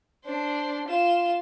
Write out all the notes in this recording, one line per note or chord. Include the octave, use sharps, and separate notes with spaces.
D4 C5
F4 E7